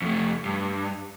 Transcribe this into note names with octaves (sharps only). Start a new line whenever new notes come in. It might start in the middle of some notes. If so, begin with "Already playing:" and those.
F2 A3
G2